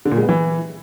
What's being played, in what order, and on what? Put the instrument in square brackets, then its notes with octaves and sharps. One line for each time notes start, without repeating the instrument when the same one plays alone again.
[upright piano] D3
A#2
G#3
B3
E3